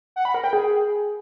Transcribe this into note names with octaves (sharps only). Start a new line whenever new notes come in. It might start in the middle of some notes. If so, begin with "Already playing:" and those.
F#5
B5
A#4
G5
G#4